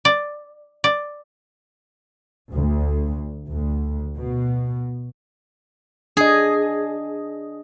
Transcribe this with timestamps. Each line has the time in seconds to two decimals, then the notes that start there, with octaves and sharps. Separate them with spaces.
0.05 D5
0.84 D5
2.55 D2
3.53 D2
4.18 B2
6.17 D4 G#4 D#5